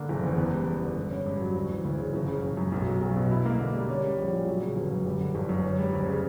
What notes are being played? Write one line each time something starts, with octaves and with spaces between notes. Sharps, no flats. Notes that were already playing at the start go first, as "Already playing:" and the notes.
Already playing: D3 A#3
F#1
E2
B3
G3
E2
D3
G2
C#4
G2
F#3
D2
E3
D2
C#3
F#1
C#3
F#1
F#2
B1
F#3
B1
B2
E4
A#3
D3
G3
C#4
G3
A#1
A#2
F#3
C#3
G1
F#2
G3
D3
G1
F#2
C#4
G3
D2
C#3